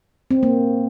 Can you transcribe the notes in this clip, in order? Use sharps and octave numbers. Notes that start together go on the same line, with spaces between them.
C4
A#3